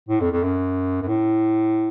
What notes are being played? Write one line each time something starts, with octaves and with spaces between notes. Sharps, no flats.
A2
F2
F2
F#2
F#2
A2